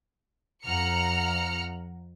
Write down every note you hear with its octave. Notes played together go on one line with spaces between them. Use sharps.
F2 F#5 A#5 F6 C#7